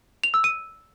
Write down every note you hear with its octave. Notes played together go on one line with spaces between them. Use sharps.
F7
E6
D#7